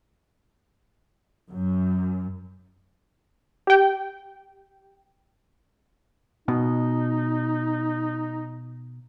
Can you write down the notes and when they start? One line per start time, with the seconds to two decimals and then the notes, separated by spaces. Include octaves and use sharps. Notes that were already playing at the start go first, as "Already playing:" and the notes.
1.50 F#2
3.67 G4 G5
6.48 B2 D#4